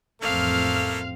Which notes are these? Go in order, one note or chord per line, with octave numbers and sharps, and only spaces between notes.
A1 F2 A3 A#3 C4 F5 F6